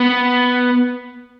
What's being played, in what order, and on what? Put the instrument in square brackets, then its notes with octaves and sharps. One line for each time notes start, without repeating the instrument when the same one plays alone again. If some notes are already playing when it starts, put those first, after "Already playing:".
Already playing: [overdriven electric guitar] B3